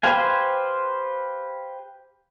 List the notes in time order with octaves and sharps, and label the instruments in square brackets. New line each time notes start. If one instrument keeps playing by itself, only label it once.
[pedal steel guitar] G4 B4 C5 F5 G#5